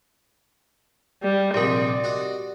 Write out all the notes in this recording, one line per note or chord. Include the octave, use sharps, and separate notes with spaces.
G3
A#1 G#2 C3 G4 A#4 D5
F#4 D#5